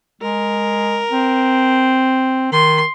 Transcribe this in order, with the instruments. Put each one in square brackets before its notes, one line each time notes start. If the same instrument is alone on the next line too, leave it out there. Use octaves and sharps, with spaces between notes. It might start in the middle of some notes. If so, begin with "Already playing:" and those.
[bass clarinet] G#3 [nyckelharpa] A#4
[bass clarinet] C4
[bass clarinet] D#3 [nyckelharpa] C6